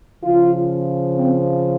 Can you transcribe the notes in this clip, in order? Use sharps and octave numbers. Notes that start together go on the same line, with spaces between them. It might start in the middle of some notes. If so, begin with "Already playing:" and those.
C#3 F3 F4
C4